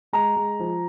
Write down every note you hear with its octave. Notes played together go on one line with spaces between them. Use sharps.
G#3 A#5
G#3
F3